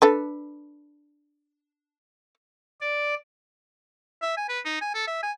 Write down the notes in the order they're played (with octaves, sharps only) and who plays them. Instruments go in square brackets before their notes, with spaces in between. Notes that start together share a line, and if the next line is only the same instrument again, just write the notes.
[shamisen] D4 A4 B4
[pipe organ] D5
[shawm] E5
G#5
B4
D#4
G#5
A4
E5
G#5